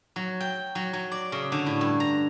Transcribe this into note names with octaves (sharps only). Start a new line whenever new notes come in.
F#3
G5
F#3
F#3
D5
C#3
D3
A2
G2
A#5